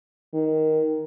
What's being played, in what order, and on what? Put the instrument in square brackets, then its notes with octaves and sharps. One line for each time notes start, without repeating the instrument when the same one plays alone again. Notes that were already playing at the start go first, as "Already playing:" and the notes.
[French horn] D#3